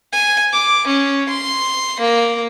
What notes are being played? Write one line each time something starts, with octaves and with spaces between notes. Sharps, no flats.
G#5
D6
C#4
C6
A#3